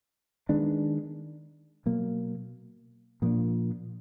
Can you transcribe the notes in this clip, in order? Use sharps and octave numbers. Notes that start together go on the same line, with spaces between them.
D#3 G#3 B3 D4
B2 F#3 A#3
A#2 F3 A#3 D4